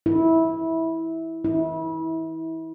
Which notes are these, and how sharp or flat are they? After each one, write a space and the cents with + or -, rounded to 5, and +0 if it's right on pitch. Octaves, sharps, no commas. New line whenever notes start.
E4 -15
E4 -30